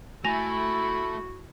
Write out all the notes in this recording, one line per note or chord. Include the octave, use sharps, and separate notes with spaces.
A3 E4 F#4 G#5 B5 A#6 F7